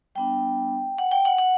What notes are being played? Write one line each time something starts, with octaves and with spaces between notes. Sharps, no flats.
G3 B3 D4 G5
F#5
G5
F#5
F#5